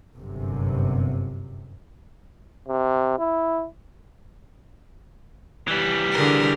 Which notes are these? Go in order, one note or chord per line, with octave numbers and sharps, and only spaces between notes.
G1 F#2 C3
C3
E4
E3 G3
D3 G#4 A#4